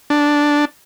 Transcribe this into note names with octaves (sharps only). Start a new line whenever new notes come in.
D4